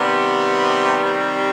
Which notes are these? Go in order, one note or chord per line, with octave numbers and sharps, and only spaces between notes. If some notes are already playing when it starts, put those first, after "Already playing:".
Already playing: C3 D#3 G3 B3
C3 C4